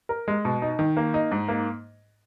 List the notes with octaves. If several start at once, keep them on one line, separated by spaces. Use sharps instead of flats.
A#4
G#3
B2
D#4
D#3
A#3
D#4
G#2
A#3